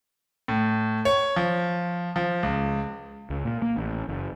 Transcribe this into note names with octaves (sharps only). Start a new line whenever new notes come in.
A2
C#5
F3
F3
C#2
C#2
A#2
A#3
A1
F#1